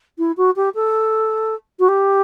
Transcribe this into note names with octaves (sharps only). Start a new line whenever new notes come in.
E4
F#4
G4
A4
F#4
G4